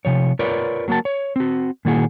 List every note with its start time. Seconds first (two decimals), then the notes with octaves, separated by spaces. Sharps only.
0.05 C3 F3 C#5
0.39 F4 A#4 B4 C#5 D5
0.88 F#3 A#3 F#4 A#4 A5
1.05 C#5
1.36 C4 F#4
1.85 A#2 D#3 A#3 E4 F#4 G#4